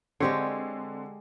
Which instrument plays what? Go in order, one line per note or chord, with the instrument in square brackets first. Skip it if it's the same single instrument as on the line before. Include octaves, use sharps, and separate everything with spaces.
[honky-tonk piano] D3 [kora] G#3 G4 C#5 [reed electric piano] C4 C6